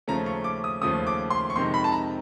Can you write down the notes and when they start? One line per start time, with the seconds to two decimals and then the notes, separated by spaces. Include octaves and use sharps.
0.08 D#2 C#3 F3 A3 C#4 A#5
0.26 C#6
0.44 D6
0.64 D#6
0.81 D#2 C#3 F3 A3 C#4 D#6
1.07 D6
1.30 C6
1.50 C#6
1.56 F2 C3 D#3 G#3 C6
1.74 B5
1.84 A5
1.92 A#5